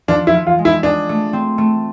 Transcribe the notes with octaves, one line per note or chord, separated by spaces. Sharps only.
F3 D4
E4
F3
F4
G#3
E4
D4 G#4
A3
C4
A3